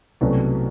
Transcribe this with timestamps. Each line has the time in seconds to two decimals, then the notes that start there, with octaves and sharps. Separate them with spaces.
0.21 C2 B2 F#3 A3 C#4